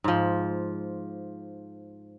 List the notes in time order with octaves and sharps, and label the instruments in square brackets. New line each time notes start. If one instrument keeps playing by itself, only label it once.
[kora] G#2 F3